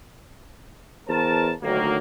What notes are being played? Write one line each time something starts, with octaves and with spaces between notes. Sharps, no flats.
E2 A#4 C5 A5
D2 D#3 F#3 A#3